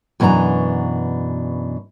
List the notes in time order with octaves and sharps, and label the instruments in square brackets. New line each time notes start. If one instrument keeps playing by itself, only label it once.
[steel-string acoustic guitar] F#2 B2 E3 D4 A#5